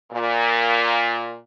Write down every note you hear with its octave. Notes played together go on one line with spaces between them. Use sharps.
A#2